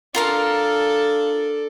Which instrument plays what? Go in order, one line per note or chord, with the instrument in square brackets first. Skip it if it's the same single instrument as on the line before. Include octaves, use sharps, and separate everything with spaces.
[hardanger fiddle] D4 A4 [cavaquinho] F4 A#4 F5